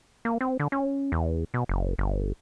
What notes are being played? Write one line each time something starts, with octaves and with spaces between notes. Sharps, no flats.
A#3
C4
D3
C#4
E2
B2
F#1
G1